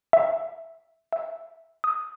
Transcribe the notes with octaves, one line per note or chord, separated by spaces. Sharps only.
E5
E5
D#6